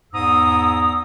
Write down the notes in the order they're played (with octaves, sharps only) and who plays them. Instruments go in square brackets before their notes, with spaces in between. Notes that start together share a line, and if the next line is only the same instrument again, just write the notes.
[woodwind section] E2 G#2 A#5 D#6 E6